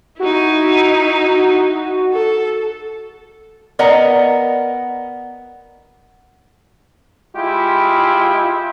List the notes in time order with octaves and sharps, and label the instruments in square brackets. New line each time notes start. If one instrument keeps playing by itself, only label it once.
[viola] D#4 E4 [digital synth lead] F#4
[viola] A4
[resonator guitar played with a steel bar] B3 A#4 D5 D#5 F#5 A#5
[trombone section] G#3 E4 F4 G4